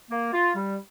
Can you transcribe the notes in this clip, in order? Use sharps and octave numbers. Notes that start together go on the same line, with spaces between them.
A#3
F4
G3